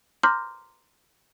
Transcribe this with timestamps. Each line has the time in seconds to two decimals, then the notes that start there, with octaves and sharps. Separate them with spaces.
0.23 A#5 C6 D6 F6 G6 A#6